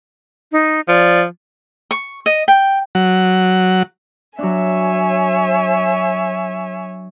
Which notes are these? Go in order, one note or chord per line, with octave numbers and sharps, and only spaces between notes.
D#4
F3 D5
C#6
D#5
G5
F#3
F#3 D4 C#5 E5 G#5